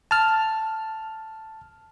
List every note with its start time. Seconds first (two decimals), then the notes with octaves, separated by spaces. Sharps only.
0.11 A5 F6